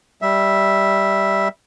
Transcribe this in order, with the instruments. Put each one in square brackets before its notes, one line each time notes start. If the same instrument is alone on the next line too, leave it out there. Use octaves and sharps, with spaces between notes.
[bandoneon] G3 E5